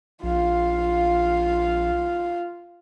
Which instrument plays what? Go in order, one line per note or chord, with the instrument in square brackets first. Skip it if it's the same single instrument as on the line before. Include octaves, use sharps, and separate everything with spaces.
[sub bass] A#1 [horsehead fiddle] F4 F5